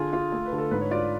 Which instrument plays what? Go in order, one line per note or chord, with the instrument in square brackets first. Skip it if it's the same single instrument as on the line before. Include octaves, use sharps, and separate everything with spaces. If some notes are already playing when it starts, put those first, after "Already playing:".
Already playing: [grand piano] D3 F4 G#4
F4
A3 A4
B4
D3
A4
G#2 B4
C#5
F4 D5